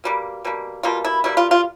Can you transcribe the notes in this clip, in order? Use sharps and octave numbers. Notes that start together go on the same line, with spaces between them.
B2 G3 A#3
B2 G3 A#3
B2 G3 A#3 F4
E4
B2 G3 A#3 E4
F4
F4